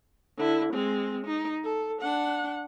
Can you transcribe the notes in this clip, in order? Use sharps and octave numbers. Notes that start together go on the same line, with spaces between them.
D3 E4
G#3 C4
D#4
A4
D4 F#5